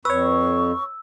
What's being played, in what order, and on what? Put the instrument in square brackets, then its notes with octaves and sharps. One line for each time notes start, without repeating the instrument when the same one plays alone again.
[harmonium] F2 [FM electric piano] B4 C#5 [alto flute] C#6 [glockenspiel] E6